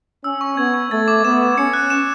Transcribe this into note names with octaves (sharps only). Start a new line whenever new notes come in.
C#4 E6
C#6
B3 G#6
C#6
A3 A6
D6
B3 E7
D6
C#4 C#7
F#6
E7